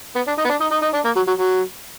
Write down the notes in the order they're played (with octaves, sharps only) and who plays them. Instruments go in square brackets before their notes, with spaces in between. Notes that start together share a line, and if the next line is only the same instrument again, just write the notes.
[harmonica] B3
D4
D#4
B3
D4
D#4
D#4
D#4
D4
A#3
F#3
F#3
F#3